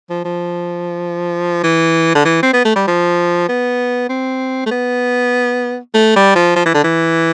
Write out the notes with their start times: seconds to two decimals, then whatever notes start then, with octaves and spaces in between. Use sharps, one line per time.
0.10 F3
0.25 F3
1.64 E3
2.15 D3
2.25 E3
2.43 C4
2.53 B3
2.65 A3
2.76 G3
2.87 F3
3.49 B3
4.09 C4
4.66 A3
4.71 B3
5.94 A3
6.16 G3
6.35 F3
6.56 F3
6.66 E3
6.74 D3
6.84 E3